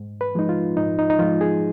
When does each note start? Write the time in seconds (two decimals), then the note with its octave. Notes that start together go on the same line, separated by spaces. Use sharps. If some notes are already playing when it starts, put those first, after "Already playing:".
Already playing: G#2
0.21 B4
0.35 F3 G#3 D#4
0.49 F4
0.77 G#2 D#4
0.99 D#4
1.10 D#4
1.19 F3 G#3 F4
1.41 G#4